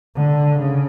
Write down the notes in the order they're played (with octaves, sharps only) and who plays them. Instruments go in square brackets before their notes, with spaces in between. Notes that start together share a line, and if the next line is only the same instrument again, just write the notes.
[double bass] D3
C#3